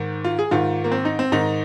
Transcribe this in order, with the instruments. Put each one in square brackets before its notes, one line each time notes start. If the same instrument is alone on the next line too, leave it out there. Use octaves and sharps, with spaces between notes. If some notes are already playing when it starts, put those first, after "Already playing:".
Already playing: [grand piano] G#2 D#3
F4
G#4
G#2 D#3 F4
A#3
C4
D#4
C4
G#2 D#3 D#4